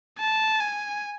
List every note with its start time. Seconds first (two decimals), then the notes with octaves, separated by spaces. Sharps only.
0.19 A5
0.60 G#5